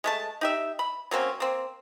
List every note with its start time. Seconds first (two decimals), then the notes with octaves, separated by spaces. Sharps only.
0.04 G#3 A3 A5
0.41 D#4 G4 E5
0.79 B5
1.11 F#3 A#3 C4 C#4
1.40 A#3 C4